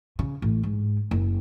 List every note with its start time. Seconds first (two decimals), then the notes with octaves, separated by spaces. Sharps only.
0.19 C#3
0.42 A1
0.63 G#2
1.11 F#1